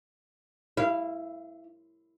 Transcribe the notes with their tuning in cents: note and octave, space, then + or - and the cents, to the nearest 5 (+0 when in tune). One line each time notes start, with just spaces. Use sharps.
E4 +0 F5 -30